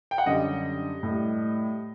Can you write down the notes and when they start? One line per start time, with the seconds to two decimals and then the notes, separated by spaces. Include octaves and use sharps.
0.11 G5
0.18 F#5
0.26 F#2 D3 G3 D#5
1.03 A2 G3